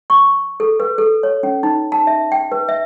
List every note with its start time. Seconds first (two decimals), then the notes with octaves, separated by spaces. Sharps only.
0.10 C#6
0.60 A4
0.80 B4
0.98 A4
1.23 C#5
1.43 C#4
1.63 D#4
1.92 A5
2.07 E5
2.32 G5
2.52 B4
2.69 E5